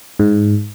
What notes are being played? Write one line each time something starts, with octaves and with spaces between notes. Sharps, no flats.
G#2